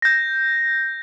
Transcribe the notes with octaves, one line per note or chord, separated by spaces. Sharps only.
G6 A#6